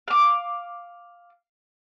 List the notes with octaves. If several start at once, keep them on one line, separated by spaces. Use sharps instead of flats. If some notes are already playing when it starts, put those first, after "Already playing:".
F5 D6